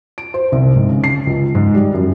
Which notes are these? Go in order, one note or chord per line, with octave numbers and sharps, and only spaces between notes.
D7
C5
C2
G#2
C#3
C7
C#2
G#2
G3
F#2